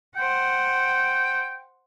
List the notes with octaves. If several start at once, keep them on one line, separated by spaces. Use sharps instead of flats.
C5 F#5 G5